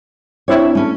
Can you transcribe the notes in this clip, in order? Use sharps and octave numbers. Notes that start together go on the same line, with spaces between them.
C4 D4 E4 C#5 E5
A3 C#4